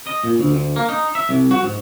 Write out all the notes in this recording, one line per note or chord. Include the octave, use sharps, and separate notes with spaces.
D#5
A#2
D2
D2
A#3
D#4
E5
C2
F#4
G#2